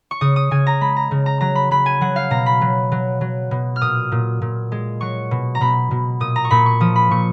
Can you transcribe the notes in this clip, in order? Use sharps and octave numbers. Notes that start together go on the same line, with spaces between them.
C#6
C#3 D#6
D#6
C#3 G#5
A#5
G#3 B5
A#5
C#3
A#5
F#3 A#5
B5
F#3 B5
G#5
F#3 F#5
F5
B2 A#5
B5
F#3
F#3
F#3
B2
F6
A#2 D#6
A#2
A#2
G#3
F#3 C#6
B2
A#5
B2 B5
B2
A#2 D#6
A#5
C#6
A#2 B5
C#6
F3 D#6
B5
A#2 C#6